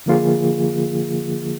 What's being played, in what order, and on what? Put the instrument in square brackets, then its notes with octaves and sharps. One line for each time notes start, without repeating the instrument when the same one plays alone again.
[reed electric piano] D3 F3 A#3 F4 G#4